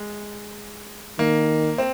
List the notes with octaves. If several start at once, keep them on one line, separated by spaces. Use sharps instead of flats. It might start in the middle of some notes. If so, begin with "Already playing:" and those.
Already playing: G#3
D#3 A#3
C4